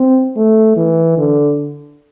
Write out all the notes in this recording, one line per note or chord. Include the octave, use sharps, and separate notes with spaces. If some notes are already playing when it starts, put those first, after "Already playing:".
Already playing: C4
A3
E3
D3